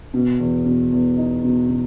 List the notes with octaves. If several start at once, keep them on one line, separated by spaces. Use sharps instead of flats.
B2
E2
B2
E2
D#4
B2
B2